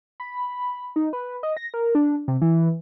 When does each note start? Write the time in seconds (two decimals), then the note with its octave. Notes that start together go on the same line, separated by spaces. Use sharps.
0.20 B5
0.96 D#4
1.13 B4
1.43 D#5
1.57 A#6
1.74 A#4
1.95 D4
2.28 C3
2.42 E3